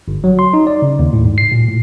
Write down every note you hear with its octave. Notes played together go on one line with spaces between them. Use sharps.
G1
F#3
C6
D#4
D5
C#3
D#2
A2
G#2
C7
A#2
A2